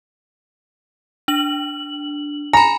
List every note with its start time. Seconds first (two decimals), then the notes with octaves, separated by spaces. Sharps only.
1.28 D4 F#7
2.53 G#5 A#5 B5